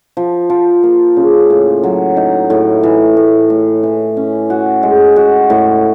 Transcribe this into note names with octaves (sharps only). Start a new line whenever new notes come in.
F3
F3
A#3
C#3
A2
F#3
D#4
A2
E3
A2
A2
E3
C#4
F#4
G#3
F#4
A2